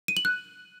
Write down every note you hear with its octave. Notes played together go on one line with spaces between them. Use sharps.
D#7
F#7
F#6